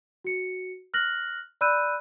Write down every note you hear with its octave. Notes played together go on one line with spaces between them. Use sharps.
F#4 C#7
F6 F#6 A#6 F#7
D5 B5 E6 F#6 G6 D#7